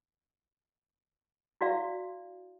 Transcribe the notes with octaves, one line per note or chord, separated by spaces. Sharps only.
E4 F#4 D5 F5